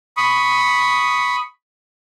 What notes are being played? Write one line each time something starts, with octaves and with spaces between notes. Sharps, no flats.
B5 C#6 D#6